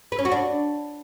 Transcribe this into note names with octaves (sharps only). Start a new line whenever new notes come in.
B4
C#4
F#4
D4